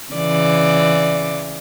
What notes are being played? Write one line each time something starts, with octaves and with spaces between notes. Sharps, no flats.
C#3 E3 D5